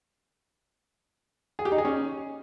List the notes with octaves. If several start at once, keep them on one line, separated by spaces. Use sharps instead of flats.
G#4
G4
D#4
G#4
C#4